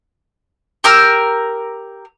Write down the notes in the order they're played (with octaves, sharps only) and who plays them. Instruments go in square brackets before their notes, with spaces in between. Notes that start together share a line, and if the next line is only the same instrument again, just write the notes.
[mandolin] G4 A#4 E6 F6